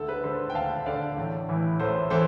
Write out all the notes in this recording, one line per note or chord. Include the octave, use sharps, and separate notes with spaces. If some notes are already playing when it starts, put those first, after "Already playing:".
Already playing: D2 A4
B4
D3 A4 C5
G5
D2 F5 A5
D3 D5 F5
A1
A2 E3
A1 A4 C5
A2 E3 A4 C5